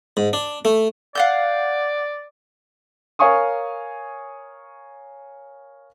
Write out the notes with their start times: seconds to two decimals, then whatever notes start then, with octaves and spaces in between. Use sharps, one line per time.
0.17 G#2
0.33 D4
0.65 A3
1.15 D5 F5 F#5 G6
3.19 A#4 C#5 F5 G#5 C#6 D#6